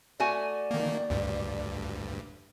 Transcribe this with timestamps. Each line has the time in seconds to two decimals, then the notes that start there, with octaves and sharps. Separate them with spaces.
0.20 A3 F#4 D5 G#5
0.71 D#3 A#3
1.10 D2 G2